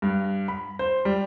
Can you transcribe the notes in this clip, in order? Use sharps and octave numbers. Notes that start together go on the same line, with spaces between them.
G2
B5
C5
G3